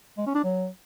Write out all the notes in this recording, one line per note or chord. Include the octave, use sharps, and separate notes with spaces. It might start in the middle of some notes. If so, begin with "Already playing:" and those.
G#3
C#4
D4
F#3